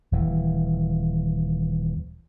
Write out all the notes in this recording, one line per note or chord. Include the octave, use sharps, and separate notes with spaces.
D#1 E3